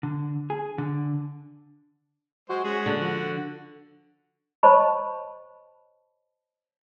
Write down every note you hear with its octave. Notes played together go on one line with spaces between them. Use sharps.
D3
G#4
D3
G#3 F#4 C5
G#3 C#4 F#4 G#4
D3
F3 F#4
C5 C#5 D#5 A5 B5 C#6